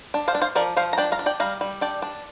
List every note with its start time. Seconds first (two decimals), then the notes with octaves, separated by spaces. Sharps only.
0.14 D4
0.28 C5 F5
0.35 D4
0.42 C5 F5
0.55 F3 A#4 D5
0.76 F3 C5 F5
0.93 A#5
0.98 D4 D5 G5
1.12 F5 A#5
1.19 D4
1.26 D5 G5
1.40 G3 F5 A#5
1.61 G3
1.81 D4 D5 G5
2.02 D4